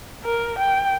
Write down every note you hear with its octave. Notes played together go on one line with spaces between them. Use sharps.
A#4
G5